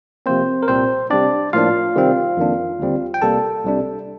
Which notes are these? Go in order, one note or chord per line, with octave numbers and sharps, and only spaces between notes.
C3 F3 A#3 C4 C5
A#4
C2 A#2 G3 C4 C5
C3 G3 C4 D4 D5
A2 F3 A#3 D4 F4 F5
C3 D#3 G3 C4
F2 D#3 A#3 D4
D#2 D3 G3 C4
G5
C2 C3 G3 A#3 A4 A5
C2 C3 G3 D4